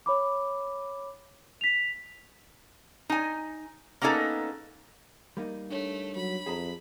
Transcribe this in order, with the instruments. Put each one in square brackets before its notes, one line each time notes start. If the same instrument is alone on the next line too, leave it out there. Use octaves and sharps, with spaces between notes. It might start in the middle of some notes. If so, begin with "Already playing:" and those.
[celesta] C#5 B5 D6
B6 F7
[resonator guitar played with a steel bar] D#4 G#5
A#3 B3 C#4 D#4 A4
[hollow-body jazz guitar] G3 A#3 D#4
[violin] A3 [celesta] D4 C#5
[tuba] F#3 [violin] B5
[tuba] F2 [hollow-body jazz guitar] G#4 A5 A#5